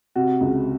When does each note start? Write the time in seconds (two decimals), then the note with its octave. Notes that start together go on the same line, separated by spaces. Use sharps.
0.16 C3 F#4
0.41 C#2